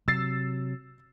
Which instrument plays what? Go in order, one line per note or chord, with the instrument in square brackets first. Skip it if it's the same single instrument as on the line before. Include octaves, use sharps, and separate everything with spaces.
[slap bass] C3 F#3 [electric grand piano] E6 A6 C7